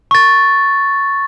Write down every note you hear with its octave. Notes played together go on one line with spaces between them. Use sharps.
C#6 A6